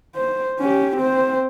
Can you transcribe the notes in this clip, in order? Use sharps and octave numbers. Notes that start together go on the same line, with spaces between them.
C5
C#4 G4
C4 C5